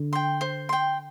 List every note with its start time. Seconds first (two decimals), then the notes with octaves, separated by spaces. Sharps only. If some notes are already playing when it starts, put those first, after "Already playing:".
Already playing: D3
0.13 G5 C6
0.41 C5
0.69 G5 C6